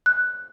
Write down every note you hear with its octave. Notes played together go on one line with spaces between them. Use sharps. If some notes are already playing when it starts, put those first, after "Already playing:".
F#6